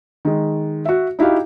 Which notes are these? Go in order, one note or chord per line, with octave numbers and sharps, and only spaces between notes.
D#3 G#3
F#4 E5
D#4 E4 F#4 G4 F5